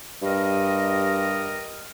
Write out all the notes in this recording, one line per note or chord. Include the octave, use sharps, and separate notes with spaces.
G2 G4 A#4 D#5